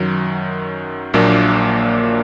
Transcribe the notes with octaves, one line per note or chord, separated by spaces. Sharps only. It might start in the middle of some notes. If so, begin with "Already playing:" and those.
Already playing: F#2 D#3 F#3
A#1 A#2 F#3 A#3 D4